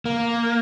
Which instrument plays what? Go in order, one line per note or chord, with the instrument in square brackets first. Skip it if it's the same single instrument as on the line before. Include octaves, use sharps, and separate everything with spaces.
[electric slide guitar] A#3